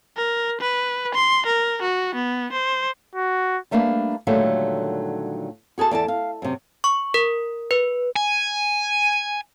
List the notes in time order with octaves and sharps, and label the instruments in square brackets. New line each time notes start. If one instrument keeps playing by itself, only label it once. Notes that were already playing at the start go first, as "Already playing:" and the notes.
[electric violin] A#4
B4
C6
A#4
F#4
B3
C5
[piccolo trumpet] F#4
[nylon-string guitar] G3 A3 A#3 D4 B4
A#2 D3 D#3 F#3 G3 A3
F#4 G#4 A4 A5
E2 D5 G5 A5
F5
F#2 C3
[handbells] C#6
A#4
B4
[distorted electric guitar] G#5